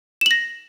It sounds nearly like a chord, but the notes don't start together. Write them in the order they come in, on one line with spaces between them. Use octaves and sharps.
E7 F#7 A#6